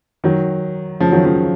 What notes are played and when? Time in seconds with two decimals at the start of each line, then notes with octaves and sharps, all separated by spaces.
0.24 D#3 F#3
1.00 C#3 F3
1.12 D#3 F#3
1.25 C#3 F3